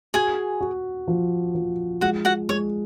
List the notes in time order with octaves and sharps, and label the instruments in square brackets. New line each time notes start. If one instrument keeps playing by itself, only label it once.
[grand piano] F#4 [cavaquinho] G#4 G#5
[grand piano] F#4
F3
F3
[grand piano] G#3 [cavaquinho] F#4 F#5
[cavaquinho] F#4 F#5
[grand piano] G#3 [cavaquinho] C#5